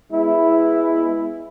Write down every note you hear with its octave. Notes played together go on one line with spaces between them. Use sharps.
G#3 B3 E4